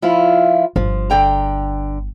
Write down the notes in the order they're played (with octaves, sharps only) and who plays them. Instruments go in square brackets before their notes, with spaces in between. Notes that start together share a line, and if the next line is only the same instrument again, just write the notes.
[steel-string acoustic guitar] F3 E4 F4
[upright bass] G1 [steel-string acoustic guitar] F3
[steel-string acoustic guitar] D3 G5 A#5